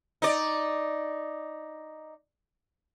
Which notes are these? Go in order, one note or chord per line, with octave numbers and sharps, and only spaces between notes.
D#4 D5